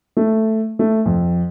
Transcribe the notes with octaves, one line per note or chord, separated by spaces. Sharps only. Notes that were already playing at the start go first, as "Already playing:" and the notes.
A3
A3
F2